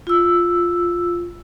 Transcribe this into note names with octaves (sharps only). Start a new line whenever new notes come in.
F4 E6